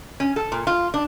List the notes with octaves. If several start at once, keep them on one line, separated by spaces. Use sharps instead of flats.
C#4
A4
A#2
F4
D4